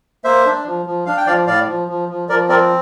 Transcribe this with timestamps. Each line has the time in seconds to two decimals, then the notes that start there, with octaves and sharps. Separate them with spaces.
0.24 A#3 C5 E5
0.46 D4
0.66 F3
0.86 F3
1.06 D4 F5
1.17 G5
1.26 F3 D5 F5
1.47 A2 D5 F5
1.67 F3
1.89 F3
2.09 F3
2.29 F3 A#4 D5
2.49 C4 A#4 D5